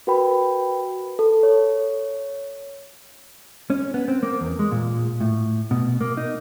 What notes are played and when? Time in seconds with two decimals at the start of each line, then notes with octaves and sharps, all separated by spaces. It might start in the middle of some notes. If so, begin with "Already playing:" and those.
0.07 F#4 A#4 B4 G5 B5
1.19 A4
1.43 C#5
3.70 C#4
3.94 B3
4.08 C4
4.23 A#3
4.41 E2
4.59 G#3
4.72 A#2
5.21 A2
5.71 B2
6.01 A#3
6.17 D#4